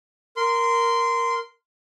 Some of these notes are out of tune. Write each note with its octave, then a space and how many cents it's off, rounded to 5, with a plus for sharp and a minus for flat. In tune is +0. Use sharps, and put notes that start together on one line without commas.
A#4 +0 C6 -15